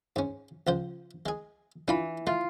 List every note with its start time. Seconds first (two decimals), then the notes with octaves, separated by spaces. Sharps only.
0.16 G#2 C#4
0.67 C#2 F3 C5
1.26 G#3 G#4
1.88 E3 D4 F4 B5
2.27 A3 F4